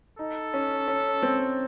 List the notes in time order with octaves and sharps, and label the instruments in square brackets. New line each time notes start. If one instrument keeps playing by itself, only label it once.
[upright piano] D#4 [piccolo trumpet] A4
[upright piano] C#4
C#4
C4